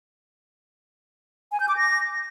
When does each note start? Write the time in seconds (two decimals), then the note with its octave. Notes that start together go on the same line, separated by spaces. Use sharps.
1.52 G#5
1.60 G6
1.68 D6
1.77 A#6